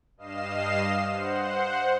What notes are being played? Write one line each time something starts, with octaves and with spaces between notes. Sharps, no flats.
G2 D#5 F5 C7 E7
C5 F#5